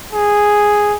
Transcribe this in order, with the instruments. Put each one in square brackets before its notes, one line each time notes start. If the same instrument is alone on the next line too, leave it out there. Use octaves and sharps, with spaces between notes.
[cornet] G#4